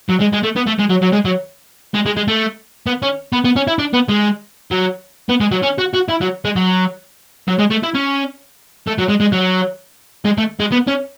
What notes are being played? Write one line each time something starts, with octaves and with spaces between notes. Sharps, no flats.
F#3
G#3
G#3
A3
B3
A3
G#3
F#3
F#3
G#3
F#3
G#3
G#3
G#3
A3
B3
C#4
B3
B3
C#4
E4
D4
B3
G#3
F#3
B3
G#3
F#3
C#4
F#4
F#4
E4
F#3
G#3
F#3
F#3
G#3
A3
E4
C#4
A3
F#3
G#3
G#3
F#3
G#3
A3
G#3
B3
C#4